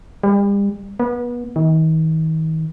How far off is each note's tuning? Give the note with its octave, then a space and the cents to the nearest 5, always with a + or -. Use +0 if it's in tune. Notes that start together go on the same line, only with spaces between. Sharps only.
G3 +40
B3 -30
D#3 +40